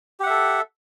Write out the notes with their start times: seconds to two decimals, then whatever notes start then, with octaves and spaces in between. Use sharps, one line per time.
0.20 G4
0.23 F#5
0.26 E5
0.30 A4